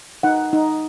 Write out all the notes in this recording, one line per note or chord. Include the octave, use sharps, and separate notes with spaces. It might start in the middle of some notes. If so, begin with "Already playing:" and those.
D#4 F#5
D#4